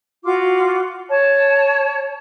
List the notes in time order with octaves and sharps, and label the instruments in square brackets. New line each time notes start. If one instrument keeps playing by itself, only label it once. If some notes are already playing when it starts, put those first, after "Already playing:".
[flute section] F4 F#4 D6
C#5 A5